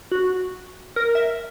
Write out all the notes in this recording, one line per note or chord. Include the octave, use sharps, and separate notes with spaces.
F#4
A#4
E5